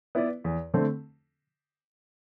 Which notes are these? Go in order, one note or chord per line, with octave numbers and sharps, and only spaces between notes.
B3 E4 B4 D5
E2
D3 A3 C4